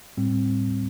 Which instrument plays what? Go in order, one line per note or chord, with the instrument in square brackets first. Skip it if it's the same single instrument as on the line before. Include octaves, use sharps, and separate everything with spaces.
[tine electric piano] A2 G3 C4